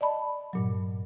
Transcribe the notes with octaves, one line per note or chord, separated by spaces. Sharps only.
D5 D#5 A5 B5
G2 A#2 F#3